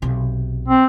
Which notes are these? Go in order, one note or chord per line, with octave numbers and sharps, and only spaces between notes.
B1 C3
C4